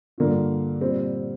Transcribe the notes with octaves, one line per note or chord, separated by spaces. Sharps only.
G2 D3 A#3 F4
A#2 G3 C4